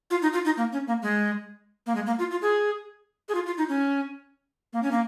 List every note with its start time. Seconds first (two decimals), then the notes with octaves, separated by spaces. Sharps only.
0.11 F4
0.22 D#4
0.33 F4
0.45 D#4
0.57 A#3
0.73 C#4
0.87 A#3
1.02 G#3
1.86 A#3
1.95 G#3
2.06 A#3
2.19 F4
2.31 F4
2.42 G#4
3.29 G#4
3.35 F4
3.46 F4
3.58 D#4
3.69 C#4
4.73 A#3
4.83 C#4
4.91 A#3